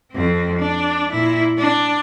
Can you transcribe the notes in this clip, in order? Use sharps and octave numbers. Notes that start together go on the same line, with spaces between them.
F2 C4
D4
A#2 E4
D4